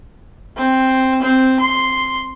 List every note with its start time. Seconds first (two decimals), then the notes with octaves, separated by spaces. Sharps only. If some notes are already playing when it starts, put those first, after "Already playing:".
0.57 C4
1.22 C4
1.60 C6